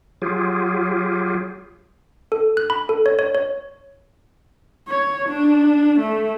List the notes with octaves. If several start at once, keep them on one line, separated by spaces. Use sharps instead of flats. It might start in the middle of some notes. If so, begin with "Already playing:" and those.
F#3 F4 G4 G#4
A4
F#6
B5
A4
C#5
C#5
C#5
C#5
D4
A3